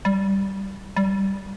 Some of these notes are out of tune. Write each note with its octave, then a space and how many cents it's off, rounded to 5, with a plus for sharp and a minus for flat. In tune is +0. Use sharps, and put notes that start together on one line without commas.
G3 -10
G3 -15